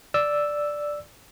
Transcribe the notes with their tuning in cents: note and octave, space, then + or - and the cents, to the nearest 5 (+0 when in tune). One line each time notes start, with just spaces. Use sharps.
D5 +0 E6 +0